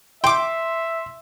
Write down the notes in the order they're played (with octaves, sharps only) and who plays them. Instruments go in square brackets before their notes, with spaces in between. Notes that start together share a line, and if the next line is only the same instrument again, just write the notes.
[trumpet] E5 [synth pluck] G5 D6 [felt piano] C6